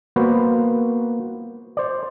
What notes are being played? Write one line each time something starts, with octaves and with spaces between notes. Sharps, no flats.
A#3 B3 F#4 B4 C5
C5 D5